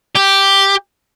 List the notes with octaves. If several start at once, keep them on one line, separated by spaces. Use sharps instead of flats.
G4